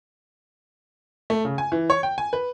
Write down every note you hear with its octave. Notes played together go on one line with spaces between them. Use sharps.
A3
C#3
G#5
E3
C#5
G5
G#5
B4